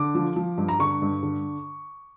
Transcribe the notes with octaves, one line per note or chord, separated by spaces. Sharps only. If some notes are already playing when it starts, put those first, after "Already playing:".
Already playing: D3 D6
F3
F3
G2
A#5
D3 C#6
G2
D3